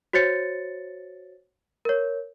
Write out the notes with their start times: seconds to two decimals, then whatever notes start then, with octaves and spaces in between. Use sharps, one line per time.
0.13 F#4 C5 C#5 A6 C#7
1.85 A#4 C#5